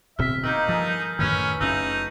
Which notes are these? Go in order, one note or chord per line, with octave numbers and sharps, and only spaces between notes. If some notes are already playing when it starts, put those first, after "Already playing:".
D1 B2 C4 E5 F6 B6
D#3 A#3 D#4 E6 F6 G6
G2 F3 G#4 A4
F#2 A2 D#3 C#4 B4 C#5
F#1 A3 C#4 D#4 F4 E6 F#7